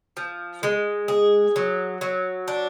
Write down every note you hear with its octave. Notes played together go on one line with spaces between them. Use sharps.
F3
G#3
G#4
F#3
F#3
D4